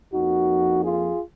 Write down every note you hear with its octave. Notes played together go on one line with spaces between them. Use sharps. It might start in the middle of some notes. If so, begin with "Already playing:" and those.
F2 F3 A#3 D#4 F#4
F4 G#4